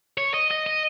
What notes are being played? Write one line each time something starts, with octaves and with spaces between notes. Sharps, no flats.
C#5
D#5
D#5
D#5